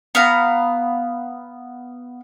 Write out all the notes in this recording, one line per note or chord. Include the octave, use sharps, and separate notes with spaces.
B3 F5 A#5